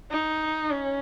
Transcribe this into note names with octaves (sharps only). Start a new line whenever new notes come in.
D#4
C#4